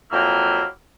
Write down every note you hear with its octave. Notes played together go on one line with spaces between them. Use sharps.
F2 F#3 A#3 E4 G5 F6